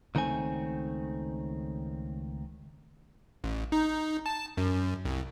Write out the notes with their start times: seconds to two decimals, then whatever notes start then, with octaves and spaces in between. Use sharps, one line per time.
0.15 C#2 D#3 A3 C4 G#5
3.44 A1
3.72 D#4
4.26 A5
4.57 F#2
5.05 C2